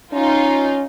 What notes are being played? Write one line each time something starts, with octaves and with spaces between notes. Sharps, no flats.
C#4 D#4 F4